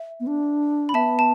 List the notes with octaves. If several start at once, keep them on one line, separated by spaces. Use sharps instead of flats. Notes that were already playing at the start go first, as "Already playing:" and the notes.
Already playing: E5
B3
D4
B5
B3 E5 A5
A5